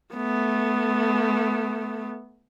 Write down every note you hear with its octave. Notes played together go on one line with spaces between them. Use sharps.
A3 B3